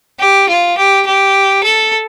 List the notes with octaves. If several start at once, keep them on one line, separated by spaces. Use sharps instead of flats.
G4
F4
G4
G4
A4